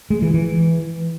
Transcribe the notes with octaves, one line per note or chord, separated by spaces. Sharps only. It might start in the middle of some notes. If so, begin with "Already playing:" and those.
G#3
E3
E3